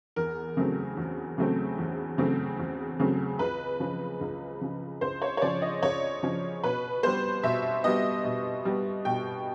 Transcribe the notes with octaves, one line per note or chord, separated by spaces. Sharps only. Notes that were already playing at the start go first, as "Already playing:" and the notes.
E2 A#4
C#3 F#3 A3 C4
E2
C#3 F#3 A3 C4
E2
C#3 F#3 A3 C4
E2
C#3 F#3 A3 C4
C#2 B4
C#3 F3
C#2
C#3 F3
C#2 C5
C#5
C#5
C#3 F3 D5
D#5
C#2 C#5
C#3 F3
B2 B4
G3 B3 C5
B2 E5
G3 B3 D#5
B2
G3 B3
B2 G5